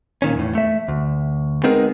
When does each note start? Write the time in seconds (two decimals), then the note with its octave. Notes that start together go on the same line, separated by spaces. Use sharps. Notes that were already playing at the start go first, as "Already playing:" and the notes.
0.22 A#2 D#3 C#4
0.35 E2 A2
0.55 A3 E5
0.88 D2
1.63 G#3 B3 C4 D#4 G#4 A#4